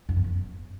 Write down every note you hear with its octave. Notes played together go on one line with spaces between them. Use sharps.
F#2
B3
F#2